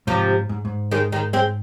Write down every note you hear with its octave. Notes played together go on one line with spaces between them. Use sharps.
G#2 C3 F3
G#2
G#2
D#3 G#3
D#3 G#3
G#3 C4